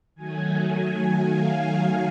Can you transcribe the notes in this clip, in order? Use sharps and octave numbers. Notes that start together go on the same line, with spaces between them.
D#3 F#3 A3 G#5
F5